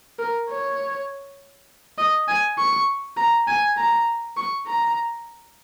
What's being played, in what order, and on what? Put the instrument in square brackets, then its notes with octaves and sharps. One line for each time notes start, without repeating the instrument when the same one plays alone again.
[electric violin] A#4
C#5
D#5
G#5
C#6
A#5
G#5
A#5
C#6
A#5